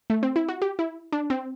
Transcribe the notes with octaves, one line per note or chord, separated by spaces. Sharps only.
A3
C4
E4
F#4
G4
E4
D4
C4